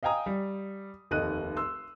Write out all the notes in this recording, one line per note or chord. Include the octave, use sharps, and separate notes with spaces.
D#5 F5 G5 G#5 A#5 D#6
G3
F1 D#2 A4 D#5 F#6 D#7
C6 E6